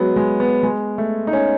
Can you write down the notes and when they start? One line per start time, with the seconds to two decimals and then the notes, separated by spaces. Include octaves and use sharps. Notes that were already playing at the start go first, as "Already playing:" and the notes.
Already playing: F#3 G#3 B3
0.16 G#3
0.40 B3
0.63 G#3
0.98 A3
1.27 D#4
1.33 C#4